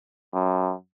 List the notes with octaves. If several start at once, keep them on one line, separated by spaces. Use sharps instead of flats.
F#2